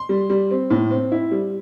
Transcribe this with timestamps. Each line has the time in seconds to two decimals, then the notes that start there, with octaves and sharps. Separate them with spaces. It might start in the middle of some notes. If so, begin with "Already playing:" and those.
Already playing: C6
0.09 G3
0.30 G3
0.51 C4
0.70 A2
0.91 C4
1.12 E4
1.31 G3